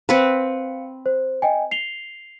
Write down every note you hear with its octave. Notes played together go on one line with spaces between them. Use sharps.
C4 B4 F5 C#7
C5
D#5 G5 G#5
C7 F7 G7